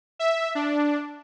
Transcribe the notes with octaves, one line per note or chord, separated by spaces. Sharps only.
E5
D4